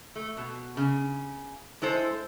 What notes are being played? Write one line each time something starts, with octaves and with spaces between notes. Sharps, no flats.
A3
B2
C#3
G#3 E4 A4 C5